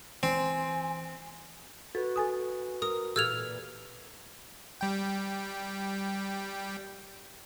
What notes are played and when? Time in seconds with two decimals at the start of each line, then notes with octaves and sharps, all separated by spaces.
0.23 E3 C4 G#5 C6
1.95 F#4 A4 B4
2.16 A4 G#5 D#6
2.82 A#4 D#6
3.16 A#2 E3 G4 A4 E6 F6 G#6 F7
4.81 G3 G5